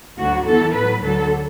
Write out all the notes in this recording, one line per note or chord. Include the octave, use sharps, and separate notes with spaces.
D2 D3 F#3 F#4
E2 E3 A4
A2 F#3 B4
D2 D3 F#3 A4